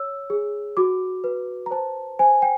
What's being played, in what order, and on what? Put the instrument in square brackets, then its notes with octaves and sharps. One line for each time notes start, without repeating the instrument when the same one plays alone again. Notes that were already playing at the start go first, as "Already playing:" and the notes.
Already playing: [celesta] C#5 E6
G#4
F#4 D6
B4
A#5
C5 A5
C5 G#5
G5